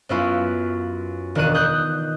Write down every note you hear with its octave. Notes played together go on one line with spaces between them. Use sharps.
F#2 B3 C#4 E4 F4 B5
E1 D#3 D4 F#6 D#7
D#6 F#6 G6